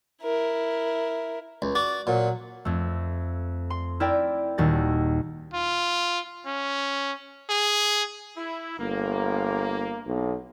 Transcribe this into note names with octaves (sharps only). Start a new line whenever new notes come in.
E4 A#4
C#2
F#4 D5
A#2 F#3
F2 A3
C6
E4 A#4 D5 G5
D#1 D#2 F#4 A6
F4
C#4
G#4
E4
G1 A#3
B1